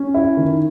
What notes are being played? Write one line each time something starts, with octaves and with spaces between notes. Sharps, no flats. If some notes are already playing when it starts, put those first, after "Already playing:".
Already playing: C#4
E4
D#3